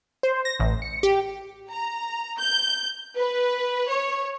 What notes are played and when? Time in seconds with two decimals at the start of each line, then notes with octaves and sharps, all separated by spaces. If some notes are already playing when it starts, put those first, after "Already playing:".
0.23 C5
0.45 A#6
0.60 A1
0.82 C#7
1.03 G4
1.70 A#5
2.39 G6
3.17 B4
3.88 C#5